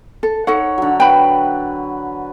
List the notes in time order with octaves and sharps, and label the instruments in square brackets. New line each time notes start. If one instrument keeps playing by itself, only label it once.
[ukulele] A4
[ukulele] D#4 A4 F#5 [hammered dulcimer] C#5
[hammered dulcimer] D3 F#3
[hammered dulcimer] B4 [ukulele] G5 B5